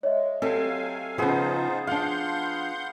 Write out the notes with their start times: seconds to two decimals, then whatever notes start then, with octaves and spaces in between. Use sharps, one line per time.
0.03 G#3 C#5 D#5 E5
0.42 F#3 C4 G4 A4 F5 G5 G#5
1.18 C#3 F3 B3 D#4 F4 G#4 B4 C5
1.87 F3 D4 F5 F#5 C6 G6